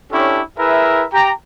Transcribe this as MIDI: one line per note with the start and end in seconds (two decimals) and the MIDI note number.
0.12 0.41 61
0.12 0.41 62
0.12 0.41 64
0.12 0.41 67
0.12 0.41 69
0.12 0.41 73
0.58 1.04 64
0.58 1.04 68
0.58 1.04 70
0.58 1.04 71
0.58 1.04 76
1.13 1.32 67
1.13 1.32 79
1.13 1.32 82